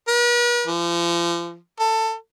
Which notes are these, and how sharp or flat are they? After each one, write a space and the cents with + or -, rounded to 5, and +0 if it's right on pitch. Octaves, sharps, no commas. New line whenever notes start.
B4 -45
F3 -35
A4 +20